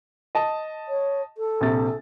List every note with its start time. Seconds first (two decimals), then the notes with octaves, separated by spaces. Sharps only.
0.35 D#5 A5
0.88 C#5
1.38 A4
1.61 A#1 C3 A6